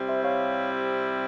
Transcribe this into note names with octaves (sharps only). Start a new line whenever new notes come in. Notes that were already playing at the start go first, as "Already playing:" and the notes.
Already playing: C3 G3 C4 E4
C5 E5
C#5 F5